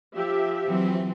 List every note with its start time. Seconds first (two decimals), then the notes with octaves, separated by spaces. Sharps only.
0.16 F3 G4 E5
0.65 E3 F#3 C4